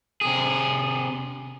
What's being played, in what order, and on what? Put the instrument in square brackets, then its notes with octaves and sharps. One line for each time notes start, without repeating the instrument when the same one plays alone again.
[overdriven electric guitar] C3 G#4